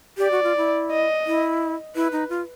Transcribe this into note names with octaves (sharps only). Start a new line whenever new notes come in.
G4 D5
F#4
F4
E4
D#5
E4
E4 B4
D#4
F4